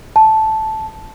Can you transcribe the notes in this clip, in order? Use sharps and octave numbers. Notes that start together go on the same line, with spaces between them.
A5